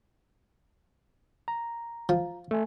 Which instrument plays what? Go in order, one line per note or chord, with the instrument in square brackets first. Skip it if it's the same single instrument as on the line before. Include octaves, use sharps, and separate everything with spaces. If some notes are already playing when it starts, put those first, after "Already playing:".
[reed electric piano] A#5
[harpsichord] F3
[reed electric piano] A3 G#5